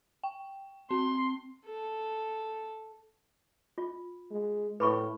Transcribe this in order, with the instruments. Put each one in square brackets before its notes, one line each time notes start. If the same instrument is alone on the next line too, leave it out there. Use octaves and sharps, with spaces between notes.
[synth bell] G5
[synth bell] C4 [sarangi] C6
[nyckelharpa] A4
[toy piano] F4
[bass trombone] G#3
[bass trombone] A2 [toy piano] B4 B5 C#6